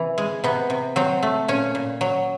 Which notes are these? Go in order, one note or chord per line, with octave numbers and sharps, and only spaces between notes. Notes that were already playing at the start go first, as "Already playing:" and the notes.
Already playing: C3 E3
G#3
C3 B3
C3
F#3 C4
A3
A#2 C#4
A#2
F#3